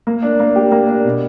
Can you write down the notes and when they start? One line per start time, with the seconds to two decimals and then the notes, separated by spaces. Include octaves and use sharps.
0.07 A#3
0.23 D4
0.40 A#3
0.56 G4
0.72 A#3
0.89 D4
1.05 B2